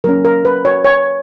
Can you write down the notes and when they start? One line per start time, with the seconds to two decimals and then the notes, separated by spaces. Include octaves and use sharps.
0.04 F#3 A#3 C#4 A#4
0.25 A#4
0.45 B4
0.65 C#5
0.84 C#5